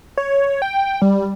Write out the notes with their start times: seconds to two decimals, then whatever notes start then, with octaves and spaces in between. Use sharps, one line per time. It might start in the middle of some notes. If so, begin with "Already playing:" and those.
0.17 C#5
0.62 G5
1.02 G3